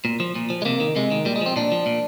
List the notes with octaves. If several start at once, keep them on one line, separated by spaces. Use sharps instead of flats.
A#2
F3
A#2
F3
G#3
C3 A#3
D#3
C3 G#3
D#3
A#2 G3
G#3
F3 C4
A#2 D4
F3
A#2